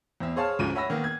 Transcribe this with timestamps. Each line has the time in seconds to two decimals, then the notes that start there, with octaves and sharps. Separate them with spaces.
0.20 E2 C4 E5
0.36 G#4 C5 C#5 F5 A5
0.59 D2 G#2 C#3 F3 D#7
0.75 C#5 E5 F#5 B5 E6 A#6
0.90 D#3 A#3 B3
1.04 G#6